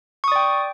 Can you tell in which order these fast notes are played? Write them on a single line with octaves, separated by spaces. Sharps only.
C#6 D#6 D5 G5